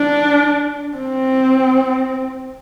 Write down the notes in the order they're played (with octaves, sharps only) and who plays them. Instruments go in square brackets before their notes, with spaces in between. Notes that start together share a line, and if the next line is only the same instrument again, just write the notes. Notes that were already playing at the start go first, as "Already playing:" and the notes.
Already playing: [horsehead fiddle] D4
C4